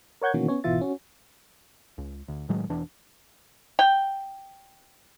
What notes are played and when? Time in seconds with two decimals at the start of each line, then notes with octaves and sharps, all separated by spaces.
0.21 A#4 C#5 F#5 G6 G#6
0.34 B2 D#3 E3 A#3 C#4 F#4
0.48 B3 C#4 C#5
0.64 G#1 B2 E3 F4 E5 A6
0.81 C#4 F#4
1.98 C#2
2.28 D2
2.49 A2 D#3 F#3 G#3
2.69 E1 E3 D4
3.79 G5